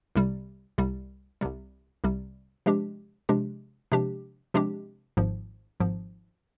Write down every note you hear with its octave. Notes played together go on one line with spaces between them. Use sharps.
C2 C3 G3
C2 C3 G3
C2 C3 G3
C2 C3 G3
C3 F3 G#3 D4 G4
C3 F3 G#3 D4 G4
C3 F3 G#3 D4 G4
C3 F3 G#3 D4 G4
G#1 G#2 F3
G#1 G#2 F3